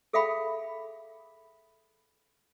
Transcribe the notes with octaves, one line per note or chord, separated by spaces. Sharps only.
G#4 A4 E5 F5 G5 B5